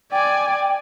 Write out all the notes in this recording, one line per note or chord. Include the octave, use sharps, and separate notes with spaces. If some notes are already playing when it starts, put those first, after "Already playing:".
D5 G5 G#5